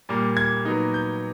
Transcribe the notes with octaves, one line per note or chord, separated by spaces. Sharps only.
A#2 G3 A#3
G#6
A#2 F#3 B3 D#4
G6